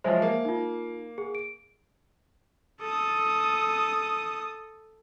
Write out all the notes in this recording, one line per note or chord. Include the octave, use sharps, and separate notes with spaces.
F3 F#3 G#3 C5 E5
A#3
D#4 F4
G#4
D7
A4 D#6